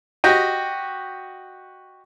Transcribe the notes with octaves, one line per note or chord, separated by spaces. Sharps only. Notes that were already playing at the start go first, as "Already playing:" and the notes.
F#4 G4 D#5 G5